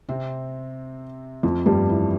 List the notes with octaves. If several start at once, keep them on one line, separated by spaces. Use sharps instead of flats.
C3 C4
F2 F3
G2 G3
E3